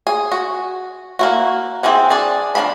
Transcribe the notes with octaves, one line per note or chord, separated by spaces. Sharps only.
G#4
F#4
A#3 E4 F#4
E3 C4 E4 G#4 F#5
D4 G#4 D5
F3 G#3 B3 D4 B5